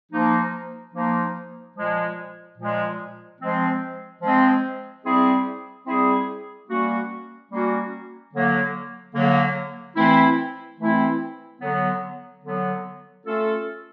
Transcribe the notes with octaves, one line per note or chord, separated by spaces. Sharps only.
F3 A#3 D#4
F3 A#3 D#4
A#2 F3 G#3
A#2 F3 G#3
F3 G#3 C4
F3 G#3 C4
G3 C4 E4 G#4
G3 C4 E4 G#4
G3 A#3 C#4 F#4
G3 A#3 C#4 F#4
D3 F#3 A#3
D3 F#3 A#3
E3 A3 C4 E4
E3 A3 C4 E4
D3 F#3 B3
D3 F#3 B3
A3 C#4 F4 A4